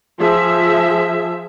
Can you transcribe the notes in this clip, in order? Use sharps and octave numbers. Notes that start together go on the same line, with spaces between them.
F3 G#4 E5